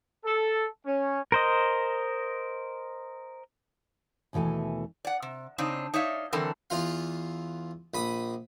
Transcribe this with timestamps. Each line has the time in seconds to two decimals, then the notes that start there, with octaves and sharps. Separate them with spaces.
0.25 A4
0.86 C#4
1.32 A#4 C5 D#5
4.33 D#2 B2 E3 A3 G#5
5.05 D5 F#5
5.22 C3
5.58 C#3 C4 D4 D#4
5.94 D#4 C#5 D5 E5 F5
6.33 D3 E3 F#3 C4 A4 A#4
6.70 E2 E3 F4 F5
7.94 A#1 B5 D#6